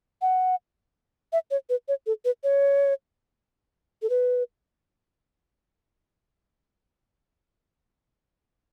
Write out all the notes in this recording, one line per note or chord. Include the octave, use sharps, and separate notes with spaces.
F#5
E5
C#5
B4
C#5
A4
B4
C#5
A4
B4